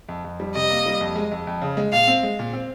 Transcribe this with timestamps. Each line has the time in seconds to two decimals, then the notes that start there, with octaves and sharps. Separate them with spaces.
0.09 F2
0.25 F2
0.40 G3
0.55 C3 D#5
0.70 A#3
0.86 G3
1.01 F2
1.16 G#3
1.32 F2
1.47 F2
1.61 C#3
1.77 G#3
1.92 A#2 F5
2.07 C4
2.23 G#3
2.39 A#2
2.53 C4